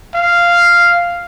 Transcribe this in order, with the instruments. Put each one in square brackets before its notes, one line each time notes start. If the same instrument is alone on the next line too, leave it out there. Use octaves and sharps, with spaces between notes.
[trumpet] F5